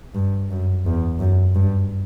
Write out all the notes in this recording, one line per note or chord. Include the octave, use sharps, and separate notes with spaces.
G2
F#2
E2
F#2
G2